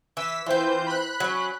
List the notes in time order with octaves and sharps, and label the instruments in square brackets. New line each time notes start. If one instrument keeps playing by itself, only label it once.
[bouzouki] E3 [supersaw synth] E6 B6
[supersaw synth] E3 C5 G6 [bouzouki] C4 F4
[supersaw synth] B5 F#6
[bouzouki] F#3 C#4